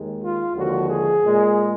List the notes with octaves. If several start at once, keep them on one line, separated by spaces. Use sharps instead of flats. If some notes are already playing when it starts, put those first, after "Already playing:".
Already playing: D#2 D#3 G#3
F4
D#2 D3 F3 G#3 F#4
G#4
A#2 G#3